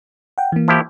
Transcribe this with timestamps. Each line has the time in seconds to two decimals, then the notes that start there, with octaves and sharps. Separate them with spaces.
0.38 F#5 G5
0.52 E3 A#3
0.68 F3 E4 G4